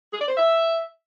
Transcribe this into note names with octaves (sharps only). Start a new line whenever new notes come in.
G#4
D5
C5
E5